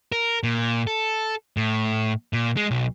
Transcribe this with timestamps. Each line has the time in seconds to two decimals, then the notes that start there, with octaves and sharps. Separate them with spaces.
0.12 A#4
0.43 A#2
0.87 A4
1.57 A2
2.33 A#2
2.57 G#3
2.71 B1